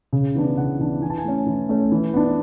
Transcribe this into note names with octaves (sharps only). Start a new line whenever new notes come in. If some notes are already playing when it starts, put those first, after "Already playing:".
C#3
E3 B3 D4
C#3 F#5
E3 B3 D4
E3 G#5
A5
G#5
A3 C#4
E3
A3 C#4
E3
B3 D4